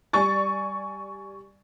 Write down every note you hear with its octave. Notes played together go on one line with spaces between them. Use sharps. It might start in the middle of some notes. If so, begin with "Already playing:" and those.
G3 D5 G#5 C#6 A6